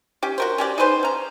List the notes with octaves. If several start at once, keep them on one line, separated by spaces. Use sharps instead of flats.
C#4 G4
F#4 A#4 C5
C#4 G4 D5
D#4 G#4 B4 C5
C#4 A#5